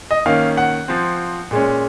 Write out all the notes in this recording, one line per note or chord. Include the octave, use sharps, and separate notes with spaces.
D#5
D#3 A#3 C#4 F5
F#5
F3 C4
A#2 G#3 C#4